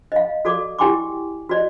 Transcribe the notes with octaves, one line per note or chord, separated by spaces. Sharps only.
D#5 F5
F#4 A4 D5 D6
E4 G4 G5 G#5 C6 D6
F#4 D5 D#5